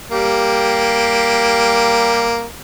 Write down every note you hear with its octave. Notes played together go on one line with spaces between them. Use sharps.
G3 A#3 G4